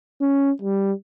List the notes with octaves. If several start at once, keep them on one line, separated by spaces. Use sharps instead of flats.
C#4
G3